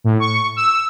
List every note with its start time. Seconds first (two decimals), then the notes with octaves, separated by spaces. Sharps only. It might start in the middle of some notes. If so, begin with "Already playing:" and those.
0.04 A2
0.20 C#6
0.56 E6